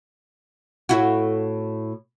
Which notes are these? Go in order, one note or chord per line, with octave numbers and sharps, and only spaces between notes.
A2 E4 F#4